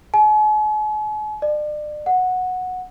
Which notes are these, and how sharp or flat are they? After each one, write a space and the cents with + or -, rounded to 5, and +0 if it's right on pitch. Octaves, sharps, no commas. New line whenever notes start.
G#5 +45
D5 +35
F#5 -10